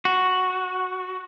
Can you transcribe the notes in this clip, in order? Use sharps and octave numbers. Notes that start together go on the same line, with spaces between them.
F#4